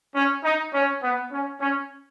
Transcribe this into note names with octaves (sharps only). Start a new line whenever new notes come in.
C#4
D#4
C#4
B3
C#4
C#4